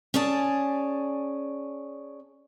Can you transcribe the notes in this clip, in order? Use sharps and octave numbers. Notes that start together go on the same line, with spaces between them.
C#4 G#4 D5 A5